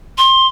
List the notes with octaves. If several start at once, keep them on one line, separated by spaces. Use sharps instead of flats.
C6